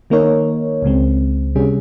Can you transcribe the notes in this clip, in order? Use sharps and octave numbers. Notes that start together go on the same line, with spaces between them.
D#3 A#3 D#4 A#4 C#5
C#2 C#3 G#3 C4
C3 G3 C#4 G#4